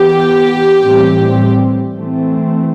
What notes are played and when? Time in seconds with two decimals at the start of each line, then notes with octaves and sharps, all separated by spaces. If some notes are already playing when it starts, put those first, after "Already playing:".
Already playing: E3 B3 G4
0.81 A2 E3 G3 C4
1.97 E3 A3 C4